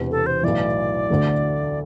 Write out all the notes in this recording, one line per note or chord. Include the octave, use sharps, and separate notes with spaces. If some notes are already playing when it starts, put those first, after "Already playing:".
Already playing: E1 E2 C3
A4
C5
B1 A2 E3 D5
D2 D3 A3